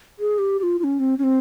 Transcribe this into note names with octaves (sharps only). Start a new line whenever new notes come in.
G#4
G4
G4
F4
F4
C#4
C4
C#4
C4